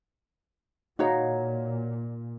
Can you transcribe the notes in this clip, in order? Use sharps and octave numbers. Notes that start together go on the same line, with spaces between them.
A#2 D#4 F#4 C#5 F5